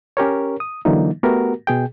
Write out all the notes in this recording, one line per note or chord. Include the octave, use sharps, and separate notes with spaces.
C#4 G4 A#4 C#5
D#6
D3 E3 F#3 A#3 D#4
A3 B3 F#4 G4 A#4
B2 G#4 G5